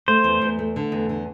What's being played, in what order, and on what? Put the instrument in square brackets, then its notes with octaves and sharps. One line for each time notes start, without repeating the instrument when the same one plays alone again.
[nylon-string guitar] A3 [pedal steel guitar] C5
[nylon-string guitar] E2
E2
A3
D3
E2
D3